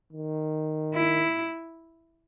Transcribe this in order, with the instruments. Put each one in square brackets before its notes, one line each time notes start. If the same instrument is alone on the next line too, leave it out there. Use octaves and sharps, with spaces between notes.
[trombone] D#3
[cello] E4